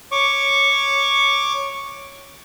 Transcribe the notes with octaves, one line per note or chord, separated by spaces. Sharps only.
C#5 C#6 D6